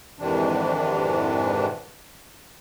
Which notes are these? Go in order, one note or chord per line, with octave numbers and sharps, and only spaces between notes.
F2 G#2 C3 D#3 E3 D4